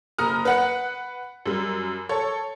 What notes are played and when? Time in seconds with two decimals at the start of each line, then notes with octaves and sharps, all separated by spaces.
0.18 F#1 A#5 D#6 F6
0.45 B4 F#5 F#6
1.46 F#2 G3
2.09 A4 C#5